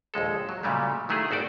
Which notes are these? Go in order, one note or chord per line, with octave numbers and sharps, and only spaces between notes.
A#1 D#2 G#3 A4
F#3
A#2 C#3 F#3 G3 A3
D#3 F#3 A3 E4 G#4
G#1 F#4 C5 D5